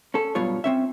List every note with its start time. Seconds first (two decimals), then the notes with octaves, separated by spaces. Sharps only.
0.14 C#4 A4
0.35 G2 B2 F#3 F4 C#5
0.64 C4 C#4 E5